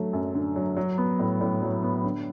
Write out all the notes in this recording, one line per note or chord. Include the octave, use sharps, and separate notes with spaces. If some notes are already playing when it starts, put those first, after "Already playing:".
Already playing: D3 F#3 A3
F#2
D3
F#3
F#3
B3
A2
A2
F#3
B3
D3